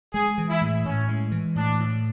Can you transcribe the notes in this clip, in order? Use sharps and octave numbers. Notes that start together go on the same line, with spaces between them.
G#3 G#4
E3
E4
A2
A2 C#4
G#3
E3
A2 D4
A2